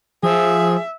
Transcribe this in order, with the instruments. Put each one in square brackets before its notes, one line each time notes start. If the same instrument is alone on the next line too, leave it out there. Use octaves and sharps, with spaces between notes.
[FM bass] F3 [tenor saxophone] G#4 [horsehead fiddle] E5